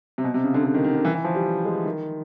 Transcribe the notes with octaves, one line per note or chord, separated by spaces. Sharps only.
C3
B2
C3
C#3
D3
D3
D#3
D#3
D3
E3
E3
F3
G3
G#3
D#3